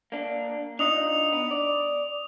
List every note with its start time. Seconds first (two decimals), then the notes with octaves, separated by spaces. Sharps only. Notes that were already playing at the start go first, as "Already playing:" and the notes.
0.12 A#3 D4
0.79 D4 D#4 F4 D#6 F7
1.32 B3
1.51 D5